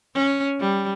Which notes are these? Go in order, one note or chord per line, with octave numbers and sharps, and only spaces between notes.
C#4
G3